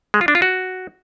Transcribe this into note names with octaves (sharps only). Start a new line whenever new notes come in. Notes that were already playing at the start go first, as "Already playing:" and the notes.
G#3
F4
D4
F4
F#4